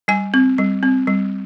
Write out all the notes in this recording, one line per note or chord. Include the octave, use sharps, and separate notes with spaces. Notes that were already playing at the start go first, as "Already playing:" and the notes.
G3 G#5
C4
G3
C4
G3